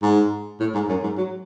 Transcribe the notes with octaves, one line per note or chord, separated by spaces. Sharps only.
G#2
A2
G#2
F#2
G#2
F#3